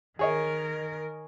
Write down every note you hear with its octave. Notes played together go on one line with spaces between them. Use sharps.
D#3 G#4 A#4 C#5 D#5